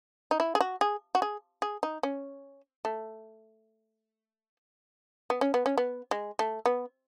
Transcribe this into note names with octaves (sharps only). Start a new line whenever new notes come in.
D#4
E4
G#4
F#4
G#4
F#4
G#4
G#4
D#4
C#4
A3
B3
C#4
B3
C#4
B3
G#3
A3
B3